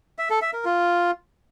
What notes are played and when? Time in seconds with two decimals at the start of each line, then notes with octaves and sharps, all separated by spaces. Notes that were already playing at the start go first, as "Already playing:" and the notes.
0.18 E5
0.30 A4
0.42 E5
0.53 A#4
0.65 F4